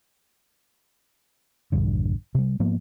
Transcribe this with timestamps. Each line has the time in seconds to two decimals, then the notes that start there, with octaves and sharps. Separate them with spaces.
1.72 A#1 E2 G2 D3
2.35 C3 G3
2.60 G#2 F3 A#3 B3